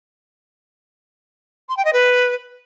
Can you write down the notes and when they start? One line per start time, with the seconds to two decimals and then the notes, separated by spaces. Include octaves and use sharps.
1.69 C6
1.77 G5
1.85 D#5
1.93 B4